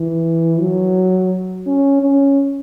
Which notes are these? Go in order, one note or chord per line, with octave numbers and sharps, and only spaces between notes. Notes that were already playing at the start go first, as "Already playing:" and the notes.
Already playing: E3
F#3
C#4
C#4